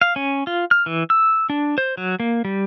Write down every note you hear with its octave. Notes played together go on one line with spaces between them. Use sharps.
F5
C#4
F4
F6
E3
E6
D4
C5
F#3
A#3
G3